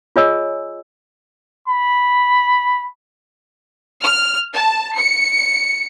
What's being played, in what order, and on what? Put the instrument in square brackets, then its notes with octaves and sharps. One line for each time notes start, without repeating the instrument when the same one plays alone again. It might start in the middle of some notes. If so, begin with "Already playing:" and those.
[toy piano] F4 G#4 C#5 D#5 G#5 E6
[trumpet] B5
[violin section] F6
A5
C#7